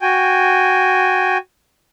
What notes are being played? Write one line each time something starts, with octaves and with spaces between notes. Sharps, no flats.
F#4 G5 G#5